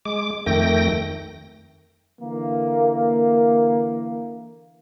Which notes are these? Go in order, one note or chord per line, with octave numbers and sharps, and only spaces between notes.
G#3 D6
F2 D#3 A3 G5 A#6
D3 E3 A#3